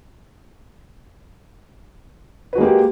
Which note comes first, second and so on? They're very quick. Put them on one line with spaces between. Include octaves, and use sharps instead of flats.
B4 F#4 G#3 A#3 G4